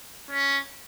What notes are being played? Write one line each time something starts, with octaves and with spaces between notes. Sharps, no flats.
C#4